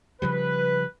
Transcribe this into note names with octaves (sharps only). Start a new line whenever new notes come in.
C#3 F3 G3 B4